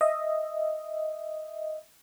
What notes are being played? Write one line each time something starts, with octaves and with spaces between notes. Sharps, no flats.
D#5 E5